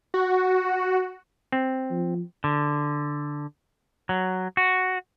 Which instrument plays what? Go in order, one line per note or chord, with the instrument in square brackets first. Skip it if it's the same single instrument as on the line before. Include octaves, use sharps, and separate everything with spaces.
[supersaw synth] F#4
[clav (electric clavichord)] C4
[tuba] F3
[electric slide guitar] D3
F#3
F#4